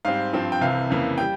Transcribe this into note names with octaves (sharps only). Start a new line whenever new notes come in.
G#2 G3 C4 F5
G2 F3 C4
G5
C2 C3 E3 F5
F2 C#3 E3 A#3
G3 G5